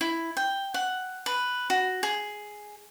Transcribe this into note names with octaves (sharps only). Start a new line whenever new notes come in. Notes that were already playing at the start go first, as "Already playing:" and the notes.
E4
G5
F#5
B4
F#4
G#4